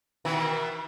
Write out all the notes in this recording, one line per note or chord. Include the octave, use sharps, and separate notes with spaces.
B2 D#3 E3